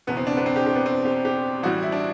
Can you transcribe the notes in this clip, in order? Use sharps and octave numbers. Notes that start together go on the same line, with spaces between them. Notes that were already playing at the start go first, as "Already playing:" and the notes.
F#1 E2 B2 B3
C4
D4
B3
C4
G4
G4
B3
C4
G4
G4
A1 A2 E3 G3 F#4
E4
D4